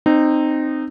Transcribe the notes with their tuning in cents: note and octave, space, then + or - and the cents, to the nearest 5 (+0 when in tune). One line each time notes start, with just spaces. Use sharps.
C4 +0 D#4 -20